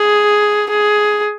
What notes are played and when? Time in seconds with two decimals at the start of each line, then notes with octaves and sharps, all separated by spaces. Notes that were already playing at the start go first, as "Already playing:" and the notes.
Already playing: G#4
0.71 G#4